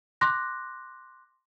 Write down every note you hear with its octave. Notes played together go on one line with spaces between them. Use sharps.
C6 D6 F#6 A#6